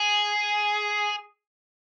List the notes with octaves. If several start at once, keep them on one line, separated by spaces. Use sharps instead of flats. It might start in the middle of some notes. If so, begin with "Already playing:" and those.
Already playing: G#4